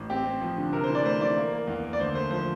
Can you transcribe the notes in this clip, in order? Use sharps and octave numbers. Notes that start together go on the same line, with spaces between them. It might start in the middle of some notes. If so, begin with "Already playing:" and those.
Already playing: A1
C4 G4
C4
F3
D3
C3 A#4
C5
E3
D5
A3 C5
E3 D5
A#3
A#3
E2
A#3
D5
D2 C5
A3 C5
F3 C5